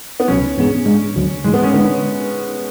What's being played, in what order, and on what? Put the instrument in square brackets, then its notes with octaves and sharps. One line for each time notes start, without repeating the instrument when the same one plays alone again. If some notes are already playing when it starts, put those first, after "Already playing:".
[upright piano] B3
[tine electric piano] C#2 B2 F#3 [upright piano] C#4
[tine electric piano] G#2 E3 B3 D4 G#4
G#2 G#3 D4
D2 D3 F#3
[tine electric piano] G#2 E3 A3 [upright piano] G#3
[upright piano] B3
C#4
[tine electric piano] D3 G#3 D4 [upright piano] B3